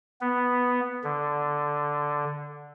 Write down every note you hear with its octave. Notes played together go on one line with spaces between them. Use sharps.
B3
D3